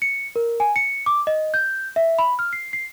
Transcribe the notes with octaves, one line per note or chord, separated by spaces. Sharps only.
C#7
A#4
G#5
C#7
D6
D#5
G6
E5
B5
F6
C7
C7